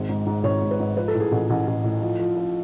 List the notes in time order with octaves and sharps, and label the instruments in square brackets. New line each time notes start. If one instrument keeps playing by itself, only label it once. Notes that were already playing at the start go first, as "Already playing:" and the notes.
Already playing: [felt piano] G#1 G#3
G#2
G#2
G#1 C#5
G#2
B4
G#2
F3 B4
A4
A2
G#4
A1 A4
A1
A1
A2
F3
F3
F3